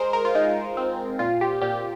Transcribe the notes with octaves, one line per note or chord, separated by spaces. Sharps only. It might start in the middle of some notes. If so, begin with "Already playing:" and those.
Already playing: G#3 G#4 A#4 C5
A#4
F4
G#3 D#4
C4
A#2 F4
G4
A#2 G4